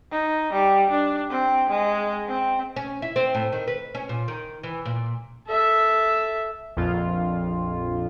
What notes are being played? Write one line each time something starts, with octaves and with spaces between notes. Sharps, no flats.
D#4
G3
D4
C4
G#3
C4
C#4
E4
C4
A2
D#3
B4
C#4
A#2
D#3
E3
A#2
A4 E5
A#1 F2 F4